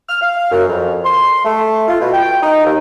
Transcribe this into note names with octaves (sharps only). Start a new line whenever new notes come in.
F6
F5
F#2
F2
C6
A3
F4
B2
G5
D#4
D#2